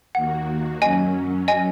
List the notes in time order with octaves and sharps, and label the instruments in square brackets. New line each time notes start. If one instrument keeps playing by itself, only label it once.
[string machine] D#2 D#3 A#3 F#4 [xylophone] F#5
[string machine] F#2 F#3 C#4 [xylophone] D#5 G#5
[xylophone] D#5 G#5